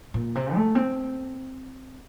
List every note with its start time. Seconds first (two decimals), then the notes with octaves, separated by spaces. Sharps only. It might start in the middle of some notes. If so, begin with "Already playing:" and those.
0.14 A#2
0.35 C3
0.55 A3
0.75 C4